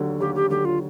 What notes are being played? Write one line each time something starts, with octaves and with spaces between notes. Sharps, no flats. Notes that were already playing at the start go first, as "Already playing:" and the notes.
Already playing: D#2 D3 F#3
D#2 G4
G4
D3 F#3 G4
F4